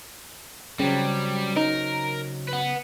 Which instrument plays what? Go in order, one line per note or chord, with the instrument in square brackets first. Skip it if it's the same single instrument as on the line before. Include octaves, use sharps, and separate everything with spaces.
[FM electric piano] C#3 [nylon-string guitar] F#3 C4 [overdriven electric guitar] G3
[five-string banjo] D#4 [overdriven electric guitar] A#4
[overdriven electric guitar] B4 F#5